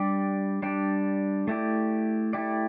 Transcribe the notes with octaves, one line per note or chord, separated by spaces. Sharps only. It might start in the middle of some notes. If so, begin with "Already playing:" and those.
Already playing: G3 D4 G4 D5
G3 D4 G4 D5
A3 E4 G4 D5
A3 E4 G4 D5